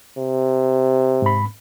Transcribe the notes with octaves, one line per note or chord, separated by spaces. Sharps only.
C3
G#2 B5